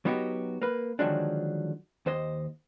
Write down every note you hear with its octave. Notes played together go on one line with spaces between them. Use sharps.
F#3 B3 D#4 F#4 G4
A#3 B4
D3 D#3 F3 F#3 G#3 D4
D#2 C5 D#5